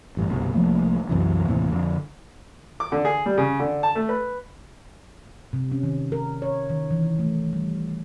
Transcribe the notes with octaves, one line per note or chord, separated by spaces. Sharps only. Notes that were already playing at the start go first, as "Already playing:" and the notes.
A1 G2
G1 C2 B2
C2 F3 A3 A#3
C2 F#2 C3 E3
D#2 A2 C3 E3
F2 D3
D6
D3
G#4
G3
C#3
D3
A5
A3
B4
C3
C#4
D#3
A#4
C#5
D#3
E3
A3
G3